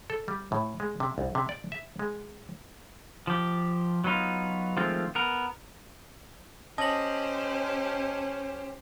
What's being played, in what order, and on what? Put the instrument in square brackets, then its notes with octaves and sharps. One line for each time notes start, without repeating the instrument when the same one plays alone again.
[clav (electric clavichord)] A4
G3
A2
G#3
C3
C2
C3
D5
E5
G#3
[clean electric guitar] F3 G4
F#3 B3 D#4 F4
D#3 F3 G#3 A3 C4 F4
B3 A#4
[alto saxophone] C#4 [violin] G4 C5 [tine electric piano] D#5 [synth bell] A5 F#7